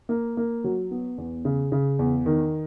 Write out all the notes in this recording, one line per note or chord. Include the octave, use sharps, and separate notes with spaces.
A#3
A#3
F#3
B3
E2
C#3
C#3
E2
D#3